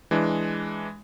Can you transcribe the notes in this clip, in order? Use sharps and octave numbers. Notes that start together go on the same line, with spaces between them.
E3 G#3 D4